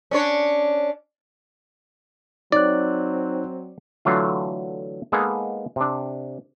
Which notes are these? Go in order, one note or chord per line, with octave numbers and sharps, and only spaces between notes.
C#4 D4 C#5
F#3 C4 D#4 C#5 D5 F#6
D3 E3 F#3 A3 F4
G#3 A#3 B3 D#4 G#4 A4
C3 D4